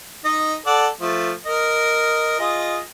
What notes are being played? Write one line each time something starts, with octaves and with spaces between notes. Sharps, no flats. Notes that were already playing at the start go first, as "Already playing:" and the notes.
D#4 D#5
A4 D5 F#5
F3 A3
A#4 D#5
F4 G#4 D#5